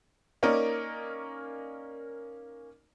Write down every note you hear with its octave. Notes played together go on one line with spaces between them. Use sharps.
A#3 C#4 D#4 A#4 D5